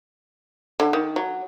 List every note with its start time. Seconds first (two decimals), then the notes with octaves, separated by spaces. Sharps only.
0.80 D3
0.93 D#3
1.16 F#3